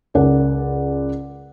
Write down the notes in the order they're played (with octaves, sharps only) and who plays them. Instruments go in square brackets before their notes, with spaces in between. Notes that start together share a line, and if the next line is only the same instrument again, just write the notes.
[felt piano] C#2 A#4 D5 F#5